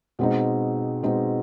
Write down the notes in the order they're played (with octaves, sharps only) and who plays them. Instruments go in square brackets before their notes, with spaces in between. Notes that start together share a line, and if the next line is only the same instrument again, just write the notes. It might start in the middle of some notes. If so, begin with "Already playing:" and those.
[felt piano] B2 G#3 C4 D#4
B2 G#3 C4 D#4